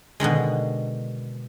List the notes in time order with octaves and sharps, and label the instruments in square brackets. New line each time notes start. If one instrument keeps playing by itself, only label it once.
[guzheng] B2 D3 D#3 G#3